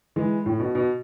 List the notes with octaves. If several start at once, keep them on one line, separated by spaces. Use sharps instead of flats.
E3 G#3
A2
B2
B2